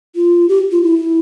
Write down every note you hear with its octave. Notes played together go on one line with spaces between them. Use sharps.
F4
G4
F4
E4